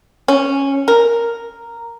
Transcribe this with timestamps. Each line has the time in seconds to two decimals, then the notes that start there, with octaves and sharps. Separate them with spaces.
0.28 C#4
0.88 A#4